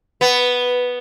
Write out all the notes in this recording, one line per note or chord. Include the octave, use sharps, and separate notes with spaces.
B3